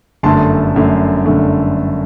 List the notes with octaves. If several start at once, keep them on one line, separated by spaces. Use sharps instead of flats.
G1 F#2 D3 A3 A5 C6
G1 F#2 D3 A3
G1 F#2 D3 A3